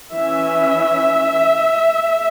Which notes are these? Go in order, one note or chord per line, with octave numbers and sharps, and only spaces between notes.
E3 C#4 E5